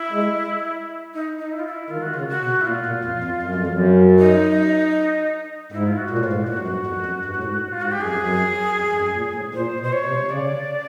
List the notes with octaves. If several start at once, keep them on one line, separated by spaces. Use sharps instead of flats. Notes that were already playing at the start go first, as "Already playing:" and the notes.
Already playing: E4
G#3
D#4
D#4
E4
F4
E4
D#3 F4
F#4
C#3 F4
F#4
B2
E4
A#2 F4
A#2
F2
F2
F#2
F2
F#2
D#4
G#2 E4
F4
F#4
A#2
A2
G#2 F4
A2
G4
A#2 F#4
F#2
G2
F2
F#2
G2
A2
G#2
F4
G#2 F#4
G4
F#2 G#4
F2
F#2
F2
F#2
A#2
A2
A#2 C5
B2
C5
C#5
C3
C#3 D5